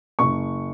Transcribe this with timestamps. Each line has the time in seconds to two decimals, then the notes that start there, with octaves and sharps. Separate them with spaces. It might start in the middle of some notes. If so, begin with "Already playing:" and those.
0.19 F#1 C#6